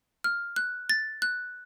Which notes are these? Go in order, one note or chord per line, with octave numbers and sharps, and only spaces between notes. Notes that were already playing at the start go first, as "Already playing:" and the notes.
F6
F#6
A6
F#6